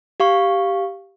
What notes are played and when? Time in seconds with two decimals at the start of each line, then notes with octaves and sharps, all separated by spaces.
0.20 G4 F5 C#6